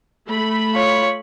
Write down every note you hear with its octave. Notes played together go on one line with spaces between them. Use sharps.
A3 B5
F4 C#5